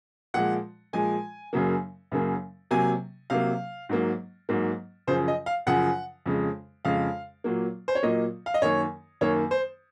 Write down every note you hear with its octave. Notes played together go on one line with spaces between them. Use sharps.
A#2 F3 G#3 F#5
A#2 F3 G#3 G#5
F#2 C#3 F#3 A#3
F#2 C#3 F#3 A#3
C3 F#3 A#3 G#5
C3 F#3 A#3 F5
G#2 F#3 A#3
G#2 F#3 A#3
F#2 C#3 F3 C5
D#5
F5
F#2 C#3 F3 F#5
F2 C#3 G#3
F2 C#3 G#3 F5
A#2 F#3 A#3
C5
C#5
A#2 F#3 A#3 D#5
F5
D#5
F#2 D#3 A#3 C#5
F#2 D#3 A#3 C#5
C5